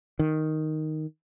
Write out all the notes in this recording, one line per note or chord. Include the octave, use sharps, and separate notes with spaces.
D#3